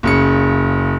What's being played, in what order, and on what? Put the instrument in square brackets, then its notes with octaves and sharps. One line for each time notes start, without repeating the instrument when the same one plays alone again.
[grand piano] F#1 C#3 C#7